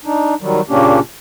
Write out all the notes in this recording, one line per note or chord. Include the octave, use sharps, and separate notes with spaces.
D4 D#4
D#3 F#3 G3
A#2 C#3 A#3 C#4 D4 G4